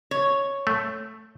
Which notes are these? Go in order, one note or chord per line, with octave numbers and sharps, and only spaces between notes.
C#5
A3